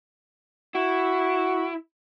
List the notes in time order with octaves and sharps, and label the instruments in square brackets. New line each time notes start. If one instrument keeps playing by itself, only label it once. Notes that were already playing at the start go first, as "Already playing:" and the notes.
[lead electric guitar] E4 [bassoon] F#4